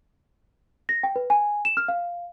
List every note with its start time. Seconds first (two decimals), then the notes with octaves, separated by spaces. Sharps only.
0.89 A#6
1.03 G5
1.16 B4
1.30 G#5
1.65 E7
1.77 F6
1.88 F5